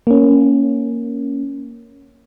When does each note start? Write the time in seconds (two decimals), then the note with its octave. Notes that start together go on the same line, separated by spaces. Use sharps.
0.07 A#3 C#4